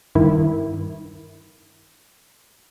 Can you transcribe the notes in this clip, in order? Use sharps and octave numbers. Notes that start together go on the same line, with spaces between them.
G2 D#3 E4